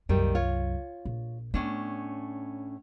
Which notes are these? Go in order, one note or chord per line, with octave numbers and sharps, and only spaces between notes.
C2 F#2 A#2 D#3 G3
F4 C#5
A#1
A2 B3 C#4 D4